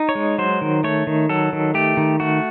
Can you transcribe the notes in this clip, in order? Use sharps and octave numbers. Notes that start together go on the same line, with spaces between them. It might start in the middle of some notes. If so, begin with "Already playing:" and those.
Already playing: D#4
C#5
G#3
F#3 C5
D#3
A3 C#5
D#3
F#3 A4
D#3
A3 G4
D#3
A3 F#4